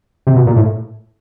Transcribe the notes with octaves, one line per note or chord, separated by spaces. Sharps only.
C3
B2
A#2
A2